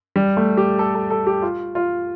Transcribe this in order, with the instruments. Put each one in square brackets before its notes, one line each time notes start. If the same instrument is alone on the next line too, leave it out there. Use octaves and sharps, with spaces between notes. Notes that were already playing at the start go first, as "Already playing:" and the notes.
[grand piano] G3
A3
G4
A4
A4
A4
G4
F4
F4